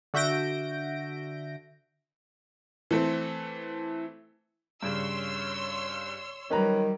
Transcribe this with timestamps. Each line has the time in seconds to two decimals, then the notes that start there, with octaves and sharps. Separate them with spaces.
0.14 D3 F#4 E5 G6 A#6 D7
2.91 E3 A3 C4
4.83 G2 C#3 C#5 C6 E6
6.50 D#3 F#3 G3 C#4 B4 A#5